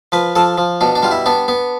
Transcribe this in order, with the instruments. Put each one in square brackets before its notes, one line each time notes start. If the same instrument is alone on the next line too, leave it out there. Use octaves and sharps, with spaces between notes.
[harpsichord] F3 B4
F3 A4
F3
B2 D4
D4
G3 F4
E4
B3 D4
B3